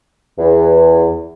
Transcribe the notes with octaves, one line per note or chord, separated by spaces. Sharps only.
E2